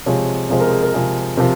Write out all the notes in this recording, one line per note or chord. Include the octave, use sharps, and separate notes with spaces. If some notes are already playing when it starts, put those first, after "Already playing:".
C3 F3 G#3 C#5
C3 F3 G#3 C5
A#4
G#4
A#4
C3 F3 G#3
C3 F3 A#4